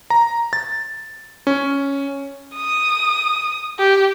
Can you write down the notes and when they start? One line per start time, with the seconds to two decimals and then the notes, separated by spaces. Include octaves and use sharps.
0.10 A#5
0.53 A6
1.47 C#4
2.55 D#6
3.79 G4